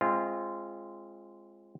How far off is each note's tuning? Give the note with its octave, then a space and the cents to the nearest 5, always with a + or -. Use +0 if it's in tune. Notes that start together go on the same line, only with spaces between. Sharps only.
G#3 +0 C4 +25 F4 -15